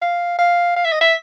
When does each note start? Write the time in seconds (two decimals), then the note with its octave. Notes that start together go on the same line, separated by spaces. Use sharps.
0.02 F5
0.39 F5
0.76 F5
0.85 E5
0.92 D#5
1.01 E5